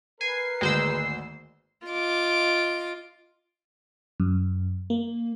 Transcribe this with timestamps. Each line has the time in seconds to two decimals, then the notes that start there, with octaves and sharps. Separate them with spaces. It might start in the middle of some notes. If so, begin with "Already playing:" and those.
0.21 A#4 B4 G#5 C7
0.61 G#1 D2 G#3 A#3 C5 E6
1.87 F4 D#5 D6
4.20 F#2
4.90 A#3